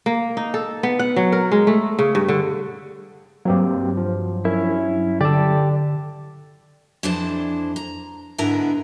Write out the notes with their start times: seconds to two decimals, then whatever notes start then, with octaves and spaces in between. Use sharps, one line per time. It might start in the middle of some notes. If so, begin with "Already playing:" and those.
0.06 A#3
0.37 D#4
0.54 A4
0.83 B3
0.99 F#5
1.16 F#3
1.32 A#4
1.52 G#3
1.67 A3
1.99 C#3
2.15 G2
2.28 D3
3.45 G2 F#3 A#3 C4 G4
3.97 F3
4.45 C#4 E4 A#4
5.21 D3 G4 A4 D5 A5
7.03 F2 E3 D4 E4 C5 A5
7.76 A#5
8.38 G#2 D3 B3 E4 A#4 A#5